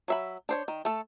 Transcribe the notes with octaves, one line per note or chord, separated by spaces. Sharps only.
F#3 E5 B5
D4 C5 C#5
D#3
A3 A4